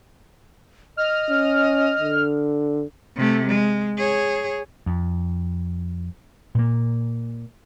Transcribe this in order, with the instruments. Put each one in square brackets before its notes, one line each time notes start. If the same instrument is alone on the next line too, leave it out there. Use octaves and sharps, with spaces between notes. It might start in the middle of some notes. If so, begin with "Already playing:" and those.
[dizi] D#5 [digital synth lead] F6
[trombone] C#4
D3
[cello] C3 A3
G#3
G#4 C#5
[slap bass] F2
A#2 A#3